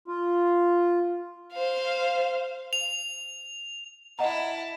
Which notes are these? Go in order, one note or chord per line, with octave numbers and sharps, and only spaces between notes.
F4
C5 F5
F7
E4 D#5 F#5 A5 A#5